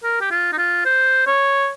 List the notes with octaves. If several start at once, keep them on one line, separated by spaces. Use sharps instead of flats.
A#4
G4
F4
D#4
F4
C5
C#5